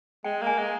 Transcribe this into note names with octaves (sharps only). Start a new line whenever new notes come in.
G#3 G5
A#3
G#5
G#3